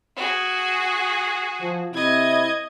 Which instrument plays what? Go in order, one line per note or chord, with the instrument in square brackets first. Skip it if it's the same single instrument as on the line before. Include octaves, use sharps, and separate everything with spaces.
[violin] F#4 G#4
[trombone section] F3
[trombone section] C3 C4 E4 [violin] D#5 G#6